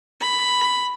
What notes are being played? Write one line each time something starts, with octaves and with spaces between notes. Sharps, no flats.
B5